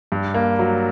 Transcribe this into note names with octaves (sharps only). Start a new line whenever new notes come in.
G2
A#3
F#3